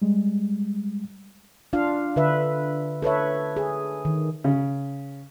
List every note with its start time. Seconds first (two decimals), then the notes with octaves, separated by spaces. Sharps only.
0.02 G3 G#3
1.73 D4 F4 F5
2.16 D3 B4 E5
3.02 A4 B4 C#5 E5
3.57 G#4
4.05 D#3
4.44 C#3